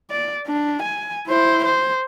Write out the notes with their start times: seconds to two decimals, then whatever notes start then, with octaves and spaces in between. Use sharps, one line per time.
0.10 D5
0.47 D4
0.83 G#5
1.27 E4 C5
1.65 C5